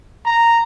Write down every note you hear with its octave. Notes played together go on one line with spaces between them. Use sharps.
A#5